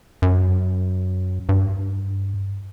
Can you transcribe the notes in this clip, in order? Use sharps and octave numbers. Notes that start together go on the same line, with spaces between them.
F#2
G2